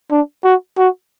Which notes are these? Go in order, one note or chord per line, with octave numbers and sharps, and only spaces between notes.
D4
F#4
F#4